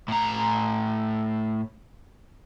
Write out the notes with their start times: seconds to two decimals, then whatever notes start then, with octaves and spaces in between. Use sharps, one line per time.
0.08 A2 A#5